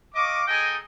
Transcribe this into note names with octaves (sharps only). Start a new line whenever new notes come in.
D#5 F5 C#6 D6
D#4 G#4 A4 D#5 G5 G#5